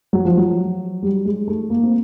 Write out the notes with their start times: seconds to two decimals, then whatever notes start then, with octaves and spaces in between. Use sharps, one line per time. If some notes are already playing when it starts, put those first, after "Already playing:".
0.13 F#3
0.25 F3
0.37 F#3
1.02 G3
1.25 G#3
1.48 A3
1.70 A#3
1.83 C4